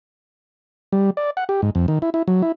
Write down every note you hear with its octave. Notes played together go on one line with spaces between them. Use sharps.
G3
D5
F#5
G4
G#2
F2
D#3
E4
E4
F#3
E4